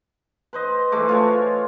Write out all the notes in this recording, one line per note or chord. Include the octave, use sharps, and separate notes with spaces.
B4 C5 D#5
E3 G#3 A3 D6
F4 C#5 G#5